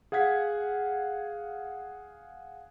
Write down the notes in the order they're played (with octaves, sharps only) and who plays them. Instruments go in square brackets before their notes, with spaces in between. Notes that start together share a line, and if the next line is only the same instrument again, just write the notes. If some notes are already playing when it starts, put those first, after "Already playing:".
[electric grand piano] G#4 F5 F#5 G#6 B6